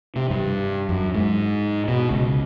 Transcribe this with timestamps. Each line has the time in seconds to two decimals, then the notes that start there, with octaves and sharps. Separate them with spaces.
0.16 C3
0.30 G2
0.89 F#2
1.14 G#2
1.88 B2
2.11 C#2